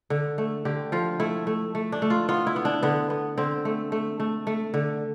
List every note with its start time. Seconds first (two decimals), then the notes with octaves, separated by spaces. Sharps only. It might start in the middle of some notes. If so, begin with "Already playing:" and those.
0.10 D3
0.38 A3
0.65 D3 G4
0.92 F3 F4
1.20 A3 E4
1.47 A3
1.75 A3
1.92 D4
2.02 A3
2.10 F4
2.29 B3 F4
2.47 E4
2.56 B3
2.65 D4
2.83 D3 B3
3.10 B3
3.38 D3 C4
3.65 A3
3.92 A3
4.20 A3
4.47 A3
4.74 D3